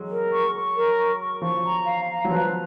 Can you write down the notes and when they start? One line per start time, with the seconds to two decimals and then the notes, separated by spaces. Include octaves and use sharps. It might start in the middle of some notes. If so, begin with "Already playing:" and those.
Already playing: F#3 G#3
0.10 A#4
0.32 C#6
0.55 C#6
0.76 A#4
0.99 C#6
1.20 C#6
1.42 F3 C#6
1.64 A#5
1.87 F5
2.09 A#5
2.25 F#3
2.30 F3 B4